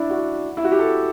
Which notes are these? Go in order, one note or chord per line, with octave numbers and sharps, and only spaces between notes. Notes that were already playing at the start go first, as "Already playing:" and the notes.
Already playing: D4 E4
F#4
E4
F#4
G4
A4